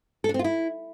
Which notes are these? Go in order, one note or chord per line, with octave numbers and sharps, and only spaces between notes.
A4
D4
C4
F4
E4